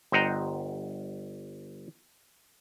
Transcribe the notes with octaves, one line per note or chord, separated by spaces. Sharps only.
G1 C5 D#5 F#5 G5 A#5